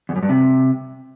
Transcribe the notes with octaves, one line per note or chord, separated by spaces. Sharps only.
E2
F#2
G2
C3